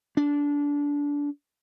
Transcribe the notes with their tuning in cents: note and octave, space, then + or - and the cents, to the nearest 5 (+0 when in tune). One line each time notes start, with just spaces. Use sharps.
D4 -20